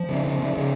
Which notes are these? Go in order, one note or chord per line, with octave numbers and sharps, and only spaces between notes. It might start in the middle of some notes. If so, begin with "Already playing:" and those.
Already playing: F3
C#3
C#3
C#3
C#3